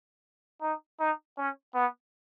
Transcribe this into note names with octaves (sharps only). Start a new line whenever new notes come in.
D#4
D#4
C#4
B3